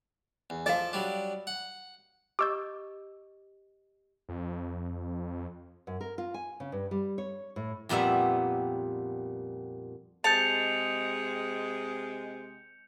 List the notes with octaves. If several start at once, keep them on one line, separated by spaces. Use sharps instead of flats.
E2
F3 A4 D#5 F5 D6
F#3 G3 D4
F#5
G4 D#5 D6 E6 G6
F2
F#2
A#4
F4
G#5
C#3
G2
G3
C#5
A2
F2 A#2 G3 B3 E5
C3 G#3 A5 G6 C#7 F7